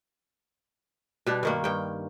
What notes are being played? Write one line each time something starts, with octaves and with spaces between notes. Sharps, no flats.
B2 G3 D4
G2 D#3 A#3
G2 G5